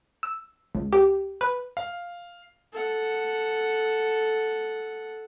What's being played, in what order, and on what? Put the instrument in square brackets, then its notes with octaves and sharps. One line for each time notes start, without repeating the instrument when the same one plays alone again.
[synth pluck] E6
C#2
G4
B4
[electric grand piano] F5
[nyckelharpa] A4 F#5